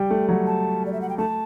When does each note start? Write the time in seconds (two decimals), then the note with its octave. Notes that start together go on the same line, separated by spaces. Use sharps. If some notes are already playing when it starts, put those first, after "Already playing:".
Already playing: G3 G5
0.10 A3
0.29 F#3
0.47 A5
0.86 D5
0.93 E5
1.01 F#5
1.09 G5
1.18 A3 A5